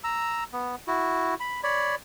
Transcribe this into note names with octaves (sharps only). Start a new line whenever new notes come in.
A#5 E6
B3
E4 F#4
B5
C#5 D5 B5